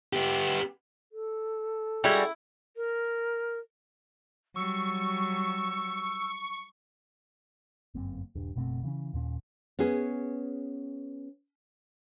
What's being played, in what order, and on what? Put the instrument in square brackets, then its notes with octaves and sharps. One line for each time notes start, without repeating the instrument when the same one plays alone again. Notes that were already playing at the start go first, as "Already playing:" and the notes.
[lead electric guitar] B3 G4
[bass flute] A4
[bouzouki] G3 G#3 F#4 [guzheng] E4
[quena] A#4
[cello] F#3 G3 [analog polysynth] C#6 [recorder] E6
[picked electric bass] G1 F#2 A#3 C4
D#1 G2
F#1 B2 A3 C4
C#3 E3 B3 C#4
D#2 A#2 C#4
[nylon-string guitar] B3 C#4 G#4